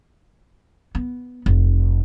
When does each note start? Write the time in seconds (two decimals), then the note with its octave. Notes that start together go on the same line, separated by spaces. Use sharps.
0.95 B3
1.46 F1